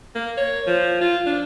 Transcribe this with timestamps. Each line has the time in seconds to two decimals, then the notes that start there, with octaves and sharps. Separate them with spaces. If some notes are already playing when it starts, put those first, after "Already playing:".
0.15 A#3
0.37 C#5
0.67 F3
1.01 F4
1.26 D4